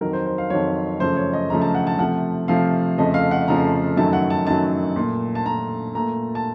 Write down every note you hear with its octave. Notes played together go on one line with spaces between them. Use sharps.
F2 D#3 F#3 A#4
C5
C5
F5
F2 D#3 F#3 C#5
F#2 C#3 F3 A3 C5
C#5
D#5
F#2 C#3 F3 A3 A#5
A5
F#5
A5
C3 F3 A3 F#5
C3 F3 A3 F5
F2 C#3 F3 A3 D#5
F5
F#5
F2 C#3 F3 A3 A#5
F#2 D#3 F#3 A3 A5
F#5
A5
F#2 D#3 F#3 A3 A5
A#2 A3
A5
A#2 A3 A#5
A#2 A3 A#5
A5